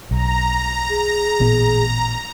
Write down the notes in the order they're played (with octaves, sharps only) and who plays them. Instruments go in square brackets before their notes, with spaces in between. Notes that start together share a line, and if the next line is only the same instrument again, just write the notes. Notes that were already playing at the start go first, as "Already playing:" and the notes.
[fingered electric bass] B1 [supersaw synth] A#5
[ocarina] G#4
[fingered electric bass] A1 A#2 B3